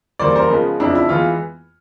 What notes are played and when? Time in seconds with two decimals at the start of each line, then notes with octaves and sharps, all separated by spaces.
0.19 C#3 E3 G3 A#3 C5 D5
0.35 A#4 C5
0.50 C#3 F3 G#3 B3
0.80 F2 C#3 F3 D4 E4
0.95 E4
1.09 E3 G#3 B3 F4